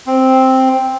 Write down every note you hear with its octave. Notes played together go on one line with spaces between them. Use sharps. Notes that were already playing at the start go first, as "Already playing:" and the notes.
C4